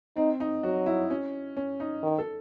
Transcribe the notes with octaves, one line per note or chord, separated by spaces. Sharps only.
C4 D#4
D#4
F#3 F#4
E4
C#4
C#4
D#4
D#3
A4